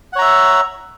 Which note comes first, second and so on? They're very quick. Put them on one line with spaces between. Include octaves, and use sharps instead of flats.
F#5 C#5 A#5 E5